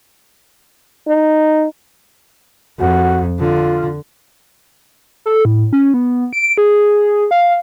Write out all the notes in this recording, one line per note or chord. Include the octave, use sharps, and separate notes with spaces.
D#4
F2 F#4
D3 F4
A4
A2
C#4
B3
D7
G#4
F5